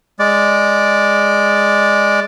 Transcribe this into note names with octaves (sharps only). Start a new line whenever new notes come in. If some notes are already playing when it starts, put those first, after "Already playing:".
G#3 D5